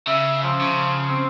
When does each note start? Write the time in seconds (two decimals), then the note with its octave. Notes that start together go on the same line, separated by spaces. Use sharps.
0.07 C#3 E5
0.43 F3
0.61 C#3
1.09 C4